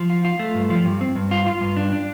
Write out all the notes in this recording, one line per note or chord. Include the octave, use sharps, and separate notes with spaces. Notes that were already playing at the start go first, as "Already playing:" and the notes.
Already playing: F3
F4
F4
A3
G2
F3
G2
C4
G2
F4
F4
G2
D4
D4